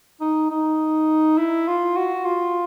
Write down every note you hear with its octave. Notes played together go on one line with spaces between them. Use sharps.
D#4
D#4
E4
F4
F#4
F4